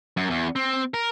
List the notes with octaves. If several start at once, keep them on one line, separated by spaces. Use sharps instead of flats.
F#2
E2
C4
A#4